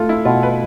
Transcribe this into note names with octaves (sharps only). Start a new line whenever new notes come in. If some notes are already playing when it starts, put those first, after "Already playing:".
Already playing: A3 F4 A4
E4
B2 F4
B4